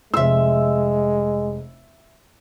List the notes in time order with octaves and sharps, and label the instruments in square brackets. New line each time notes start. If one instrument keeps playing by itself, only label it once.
[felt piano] F1 E6 [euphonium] G#3 [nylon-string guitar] F4 E5